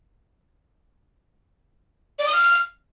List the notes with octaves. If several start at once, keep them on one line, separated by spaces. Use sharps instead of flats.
D5
D#6
F6